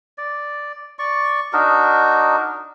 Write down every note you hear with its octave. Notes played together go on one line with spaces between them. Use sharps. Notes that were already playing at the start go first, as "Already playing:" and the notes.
D5
D5 C#6
D4 D#4 F#4 A#4